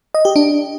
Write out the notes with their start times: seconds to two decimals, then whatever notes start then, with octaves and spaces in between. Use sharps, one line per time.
0.14 D#5
0.25 G4
0.36 D4